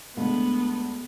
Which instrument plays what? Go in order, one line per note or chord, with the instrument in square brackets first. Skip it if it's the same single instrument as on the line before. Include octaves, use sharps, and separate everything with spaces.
[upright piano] D2 G#3 [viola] B3